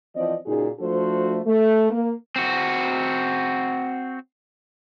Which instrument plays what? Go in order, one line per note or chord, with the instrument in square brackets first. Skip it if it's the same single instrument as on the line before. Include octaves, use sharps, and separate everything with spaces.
[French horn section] E3 F3 C4 D5 D#5
A#2 C#3 D#4 F#4 G#4
F3 A3 D4 F#4 A4 C5
A3
A#3
[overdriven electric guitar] C4 F#4